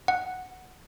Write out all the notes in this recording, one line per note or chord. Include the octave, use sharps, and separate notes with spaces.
F#5